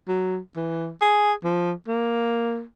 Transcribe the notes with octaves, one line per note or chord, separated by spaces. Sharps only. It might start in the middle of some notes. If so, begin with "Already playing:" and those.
F#3
E3
G#4
F3
A#3